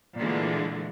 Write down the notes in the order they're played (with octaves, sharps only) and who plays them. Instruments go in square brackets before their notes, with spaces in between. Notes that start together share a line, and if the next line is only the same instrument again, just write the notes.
[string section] A#2 D3 E3 G#3 A3